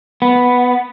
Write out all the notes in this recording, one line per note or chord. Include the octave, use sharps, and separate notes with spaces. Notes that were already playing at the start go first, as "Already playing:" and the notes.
B3